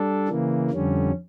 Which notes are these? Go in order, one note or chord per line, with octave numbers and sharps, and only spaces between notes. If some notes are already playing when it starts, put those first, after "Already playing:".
Already playing: G3 D4 A4
C#3 E3 A#3
F2 D3 G3 C#4